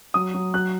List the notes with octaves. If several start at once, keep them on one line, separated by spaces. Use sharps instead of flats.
F#3 D#6
F#3
F#3 F#6